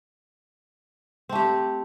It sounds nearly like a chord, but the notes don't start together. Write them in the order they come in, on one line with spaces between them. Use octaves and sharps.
C4 A3 G4